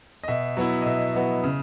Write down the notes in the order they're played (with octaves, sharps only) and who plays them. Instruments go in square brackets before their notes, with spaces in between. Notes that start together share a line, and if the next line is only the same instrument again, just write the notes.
[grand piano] D#5
B2 E5
F#3 B3 E4
D#5
B2 E5
F#3 B3 E4
C#3